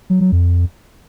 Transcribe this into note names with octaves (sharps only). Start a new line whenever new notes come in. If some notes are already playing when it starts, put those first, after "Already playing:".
F#3
F#3
F2